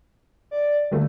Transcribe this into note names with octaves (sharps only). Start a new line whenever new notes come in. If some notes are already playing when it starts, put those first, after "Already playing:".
D5
D3 G3 A3 A#3